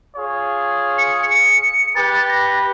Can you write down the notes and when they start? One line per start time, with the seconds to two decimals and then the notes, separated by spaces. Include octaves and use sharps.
0.16 F4 G#4 C#5
0.97 C#7
1.30 C#7
1.95 G4 B4 A6
2.28 A#6